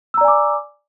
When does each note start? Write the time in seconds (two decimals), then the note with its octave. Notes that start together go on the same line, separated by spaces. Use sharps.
0.14 E6
0.18 A#5
0.21 D5
0.24 G#5
0.28 D6